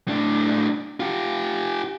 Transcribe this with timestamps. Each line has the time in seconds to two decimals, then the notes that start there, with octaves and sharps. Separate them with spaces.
0.08 A2 D4
1.00 F4 G4